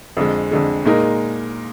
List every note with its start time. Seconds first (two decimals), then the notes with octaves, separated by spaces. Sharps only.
0.17 F2 D3 G#3
0.51 F2 D3 G#3
0.85 A#2 G#3 D#4 A#4